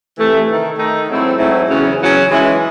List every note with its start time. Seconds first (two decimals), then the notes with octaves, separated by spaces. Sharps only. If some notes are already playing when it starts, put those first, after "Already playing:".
0.18 C3 E3 A3
0.47 D#3 A3 D#4
0.78 D#3 A3 D#4
1.08 G#2 F#3 A3 C4 E4
1.38 G#2 F#3 A3 C4 E4
1.69 E2 C#3 F#3 C#4
1.99 E2 C#3 F#3 C#4
2.30 E3 G#3 C#4 E4